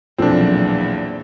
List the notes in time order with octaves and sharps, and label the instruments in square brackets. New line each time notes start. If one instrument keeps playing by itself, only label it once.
[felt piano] B1 F3 A4 [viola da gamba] E2 A#2 [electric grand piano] C4 D4